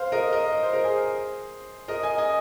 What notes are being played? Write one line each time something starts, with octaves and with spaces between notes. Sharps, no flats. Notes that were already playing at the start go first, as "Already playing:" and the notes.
Already playing: C5 F5
A#4 D#5
A#4 D#5
D#5
C5
A#4
G#4 C5
A#4 D#5
D#5 G#5
D#5 G#5